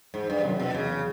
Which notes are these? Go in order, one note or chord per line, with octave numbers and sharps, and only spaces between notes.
E2 G#2
G2
F#2 C3 D#3 F#3
B2
E2 C#3